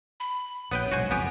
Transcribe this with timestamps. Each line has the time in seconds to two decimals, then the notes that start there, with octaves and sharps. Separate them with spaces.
0.20 B5
0.71 A#1 B3 B4 C#5 G5
0.92 B1 G#2 F#4 C5 G#5
1.11 F#1 F2 B3 G4 G#5